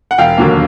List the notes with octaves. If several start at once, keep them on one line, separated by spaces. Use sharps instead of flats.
F#5
E1 F5 G5
D#2 D3 F#3 A#3